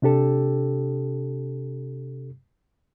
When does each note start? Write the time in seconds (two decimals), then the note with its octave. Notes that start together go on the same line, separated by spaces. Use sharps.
0.02 C3 D4 G4 A4